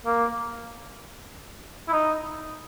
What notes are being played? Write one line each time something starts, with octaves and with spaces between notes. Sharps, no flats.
A#3
E4
D#4